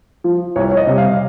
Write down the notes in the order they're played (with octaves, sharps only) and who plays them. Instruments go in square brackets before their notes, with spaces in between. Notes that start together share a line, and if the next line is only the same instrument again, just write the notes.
[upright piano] F3
C2 C#5
C#5
D#5
C3 G3
F5